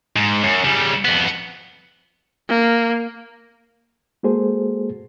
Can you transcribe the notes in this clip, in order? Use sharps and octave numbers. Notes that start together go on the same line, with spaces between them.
G#2
F#2
C#3 G3
F2 B3
A#3
G#3 A#3 F#4 G#4 A4 C5